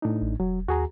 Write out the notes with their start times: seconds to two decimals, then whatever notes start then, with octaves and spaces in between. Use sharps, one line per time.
0.02 A2 D4 D#4
0.22 A1
0.40 E1 F#3
0.68 D#2 F#4 G#4 A#5